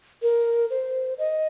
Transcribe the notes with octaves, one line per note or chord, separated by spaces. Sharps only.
A#4
C5
D#5